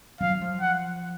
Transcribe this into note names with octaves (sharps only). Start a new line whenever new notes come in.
F#3 F5
F3
F#5